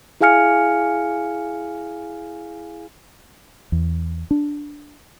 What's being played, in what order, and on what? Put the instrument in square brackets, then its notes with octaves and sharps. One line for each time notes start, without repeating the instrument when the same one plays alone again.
[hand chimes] E4 G#4 F5 G#5 F6 C#7
[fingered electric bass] E2
D4